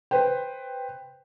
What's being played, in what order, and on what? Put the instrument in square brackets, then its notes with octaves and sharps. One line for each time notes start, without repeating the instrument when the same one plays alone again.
[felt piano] B4 C5 G5